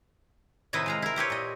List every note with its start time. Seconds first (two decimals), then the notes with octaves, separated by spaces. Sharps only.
0.73 A2 C3 D#3 E4 B4 D#5
0.86 G#3 F5 A#5
1.02 E4 A#4
1.16 C4 G4 B4 C#5
1.30 A#2 D#5